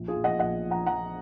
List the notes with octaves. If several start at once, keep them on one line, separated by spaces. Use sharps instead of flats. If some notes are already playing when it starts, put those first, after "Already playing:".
Already playing: A#1
F4 G#4
A#1
D#5 F#5
A#1 D#5 F#5
F3
F#5 A#5
F3 F#5 A#5